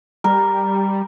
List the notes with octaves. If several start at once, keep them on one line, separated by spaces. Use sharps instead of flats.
G3 A#4